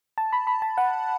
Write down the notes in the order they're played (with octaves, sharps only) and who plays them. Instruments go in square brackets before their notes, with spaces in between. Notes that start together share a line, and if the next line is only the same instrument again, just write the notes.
[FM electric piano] A5
B5
B5
A5
F#5